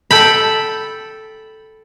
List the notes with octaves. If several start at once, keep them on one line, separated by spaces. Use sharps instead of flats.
A4 G5 B5